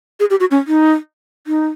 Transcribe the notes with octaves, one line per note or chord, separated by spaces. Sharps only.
G#4
G4
F#4
C#4
D#4
D#4